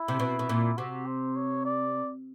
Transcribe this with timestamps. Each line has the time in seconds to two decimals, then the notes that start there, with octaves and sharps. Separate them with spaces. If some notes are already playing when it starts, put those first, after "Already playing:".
Already playing: E4
0.08 C3
0.20 B2
0.39 B2
0.49 A#2
0.77 C3 F#4
1.06 C5
1.36 C#5
1.65 D5